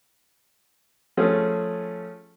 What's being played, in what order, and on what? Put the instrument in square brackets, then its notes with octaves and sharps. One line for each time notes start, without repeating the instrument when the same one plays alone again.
[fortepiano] F3 A3 C#4 G#4